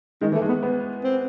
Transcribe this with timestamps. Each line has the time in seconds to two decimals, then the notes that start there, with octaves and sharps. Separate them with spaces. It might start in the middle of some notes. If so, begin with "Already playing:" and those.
0.21 D#3 G#3
0.32 E3
0.35 A3
0.42 G#3
0.49 B3
0.63 B3
1.04 C4